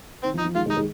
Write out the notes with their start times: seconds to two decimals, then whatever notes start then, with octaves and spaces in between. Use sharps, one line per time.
0.23 D#3 C4
0.34 F3
0.39 D#4
0.45 F3
0.55 D#3 G#3 F4
0.66 D#3 G#3
0.71 D#4
0.77 D#3 G#3